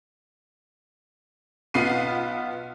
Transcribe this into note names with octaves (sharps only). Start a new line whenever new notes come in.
B1 B3 F4 C7 D#7